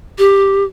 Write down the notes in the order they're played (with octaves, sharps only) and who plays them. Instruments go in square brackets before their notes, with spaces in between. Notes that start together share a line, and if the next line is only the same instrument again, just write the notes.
[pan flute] G4